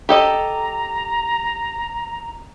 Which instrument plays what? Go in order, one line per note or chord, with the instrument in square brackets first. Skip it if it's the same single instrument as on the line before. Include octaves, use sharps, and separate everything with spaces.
[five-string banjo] G4 A4 D#5 [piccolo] A#5